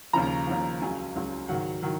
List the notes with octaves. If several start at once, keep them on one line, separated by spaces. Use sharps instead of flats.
D#2 C#3 F3 A#5
D#2 C#3 F3
C#2 C#3 F#3 G#5
C#2 C#3 F#3
G#2 D#3 F#3 F#5
D#3 F#3